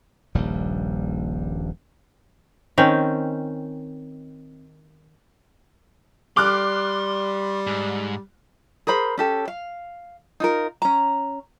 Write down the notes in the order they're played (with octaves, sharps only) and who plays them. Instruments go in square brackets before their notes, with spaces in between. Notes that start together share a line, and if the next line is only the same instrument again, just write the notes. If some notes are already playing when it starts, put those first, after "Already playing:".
[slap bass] D#1 A#1 G2 G3
[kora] D#3 C4 C#4
[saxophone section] G3 [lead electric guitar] C6 [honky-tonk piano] D6 F6 F#6
[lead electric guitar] G#2
[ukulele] G#4 A#4 C5 B5
C#4 G4 A4
F5
D#4 F4 A#4
C#4 A#5